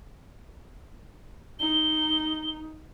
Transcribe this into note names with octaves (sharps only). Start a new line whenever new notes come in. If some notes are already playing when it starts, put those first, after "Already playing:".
D#4 G7